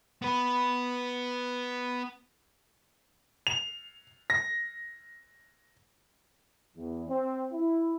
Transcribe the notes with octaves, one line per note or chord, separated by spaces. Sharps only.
B3 B4
F7
A#6
E2
C4
E4